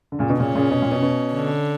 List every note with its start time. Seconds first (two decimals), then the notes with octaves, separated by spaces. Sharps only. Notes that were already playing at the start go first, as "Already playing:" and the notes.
0.12 D3
0.19 A#2 C#3
0.29 B2 D3
0.40 A#2 C#3 C#4
0.55 A#2 C#3
0.71 B2
0.82 A#2
0.91 B2
1.02 B2
1.34 D3